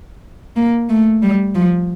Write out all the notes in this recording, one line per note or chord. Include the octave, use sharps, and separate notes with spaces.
A#3
A3
G3
F3